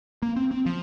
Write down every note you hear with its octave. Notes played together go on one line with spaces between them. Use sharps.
A#3
C4
C4
F3